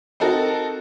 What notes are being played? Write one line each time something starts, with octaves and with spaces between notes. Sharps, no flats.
C4 D#4 F#4 A4 A#4